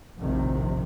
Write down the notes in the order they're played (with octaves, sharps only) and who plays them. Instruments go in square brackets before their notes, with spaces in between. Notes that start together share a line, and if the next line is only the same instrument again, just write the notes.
[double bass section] F1 A#1 A2 C3 D#3